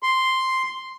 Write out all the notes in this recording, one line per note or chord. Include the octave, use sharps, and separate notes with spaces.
C6